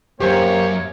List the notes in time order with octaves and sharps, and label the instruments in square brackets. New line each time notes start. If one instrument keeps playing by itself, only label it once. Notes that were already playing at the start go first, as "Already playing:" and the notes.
[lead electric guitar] F#2 [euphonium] A#3 [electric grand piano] G4 C5 G#5 [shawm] C#5